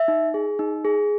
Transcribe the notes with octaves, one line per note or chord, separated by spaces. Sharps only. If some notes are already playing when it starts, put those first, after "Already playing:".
Already playing: E5
D#4
G#4
D#4
G#4